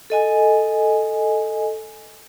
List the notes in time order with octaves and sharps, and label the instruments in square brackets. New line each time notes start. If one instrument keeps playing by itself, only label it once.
[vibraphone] A4 D#5 G#5